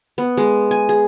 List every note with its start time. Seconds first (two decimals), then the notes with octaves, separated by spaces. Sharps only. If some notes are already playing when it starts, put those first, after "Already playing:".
0.18 B3
0.37 G#3
0.71 G#5
0.89 G#4